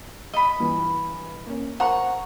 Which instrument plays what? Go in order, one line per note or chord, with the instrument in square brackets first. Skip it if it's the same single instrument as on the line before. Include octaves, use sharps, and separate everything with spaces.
[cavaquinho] D#5 B5
[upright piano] G2 E3
A#3 C#4
[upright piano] A#4 C5 A#5 [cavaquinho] F#5 C#6